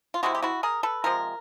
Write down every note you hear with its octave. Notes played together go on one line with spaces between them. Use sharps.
F4
C3 F3 G#3 E4 F#4
G4
E4 F#4
G#4 A#4
A4 B4
C3 F3 G#3 A#4